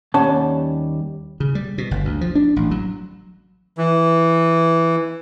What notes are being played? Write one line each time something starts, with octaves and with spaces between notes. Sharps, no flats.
D#2 G3 C#4 D5 F#5 A5
C#3
G3
B2
G1
D2
F3
D4
A1
F#3
E3